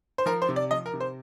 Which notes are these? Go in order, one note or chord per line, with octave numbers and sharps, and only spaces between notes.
C5
F3 A#4
C5
C3
D5
F3 D#5
A#4
C3
C5